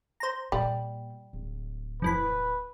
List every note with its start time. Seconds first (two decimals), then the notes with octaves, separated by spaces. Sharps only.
0.20 C5 A#5
0.52 A#2 G3
1.33 D1
2.02 F2 E3 B4 B5